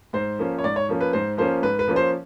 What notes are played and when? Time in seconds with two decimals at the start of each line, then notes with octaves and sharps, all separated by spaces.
0.13 G#2 C5
0.39 F3 A#3 C#4
0.58 C#5
0.64 G#2 D5
0.76 C#5
0.89 F3 A#3 C#4
1.01 B4
1.13 G#2 C5
1.37 F3 A#3 C#4 C5
1.62 G#2 B4
1.79 B4
1.88 F3 A#3 C#4
1.96 C5